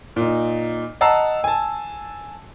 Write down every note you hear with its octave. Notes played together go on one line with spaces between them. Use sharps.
A#2 D#4
D#5 F#5 A5 A#5 E6 C7
G#5 A5